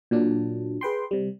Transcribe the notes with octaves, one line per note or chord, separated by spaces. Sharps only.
A#2 F#3 D4
G#4 B4 G5 C6
C3 G3